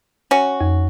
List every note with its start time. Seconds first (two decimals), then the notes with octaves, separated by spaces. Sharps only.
0.31 C#4 F#4
0.61 F2